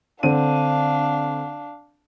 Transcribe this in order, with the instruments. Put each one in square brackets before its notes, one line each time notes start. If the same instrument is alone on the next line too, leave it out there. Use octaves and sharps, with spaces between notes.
[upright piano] D3 C4 D#7 [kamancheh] D4 F5